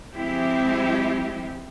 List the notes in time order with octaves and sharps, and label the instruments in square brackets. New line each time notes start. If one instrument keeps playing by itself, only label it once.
[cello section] F3 G#3 C4 E4 G4